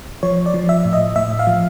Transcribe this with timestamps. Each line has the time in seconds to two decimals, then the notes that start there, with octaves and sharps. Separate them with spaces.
0.23 F3 C#5
0.46 D5
0.54 F3
0.69 E5
0.85 A2
0.93 D#5
1.16 A2 E5
1.39 F5
1.47 F3